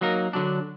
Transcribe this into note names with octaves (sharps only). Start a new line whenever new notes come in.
F#3 A#3 D#4 A#4
D3 F#3 D4